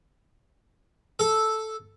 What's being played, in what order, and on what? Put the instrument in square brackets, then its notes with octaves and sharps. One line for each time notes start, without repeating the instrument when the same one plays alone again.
[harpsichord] A4